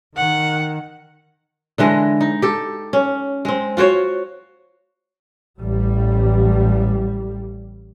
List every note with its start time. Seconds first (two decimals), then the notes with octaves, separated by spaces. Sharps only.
0.17 D#3 F#5
1.78 D3 E3 G#3 D#5
2.21 D#4
2.42 G4 A4
2.93 C#4
3.45 G#3 C4
3.77 F4 F#4 C5 C#5
5.60 A1 G3